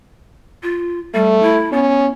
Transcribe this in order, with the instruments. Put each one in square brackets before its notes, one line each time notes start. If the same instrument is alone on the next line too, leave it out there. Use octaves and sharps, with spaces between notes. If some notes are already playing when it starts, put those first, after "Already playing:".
[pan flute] F4
[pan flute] G3 [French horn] A3
[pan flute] E4
[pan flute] B3 [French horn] C#4